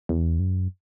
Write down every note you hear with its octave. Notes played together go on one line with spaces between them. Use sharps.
E2
F#2